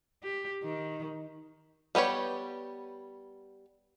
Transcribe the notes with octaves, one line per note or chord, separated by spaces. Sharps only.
G4
D#3
G3 B3 G4 C#5